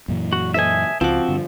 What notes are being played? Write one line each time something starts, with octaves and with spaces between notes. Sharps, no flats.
F#2 A#2 E3
F#4
A4 C5 D#5 E5 G#5
C#2 F3 C4 F#4 D6
G2 D3